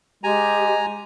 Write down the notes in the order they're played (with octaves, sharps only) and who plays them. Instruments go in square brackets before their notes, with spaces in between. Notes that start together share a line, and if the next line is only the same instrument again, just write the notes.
[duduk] G#3 [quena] G4 [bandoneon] G#5 A#5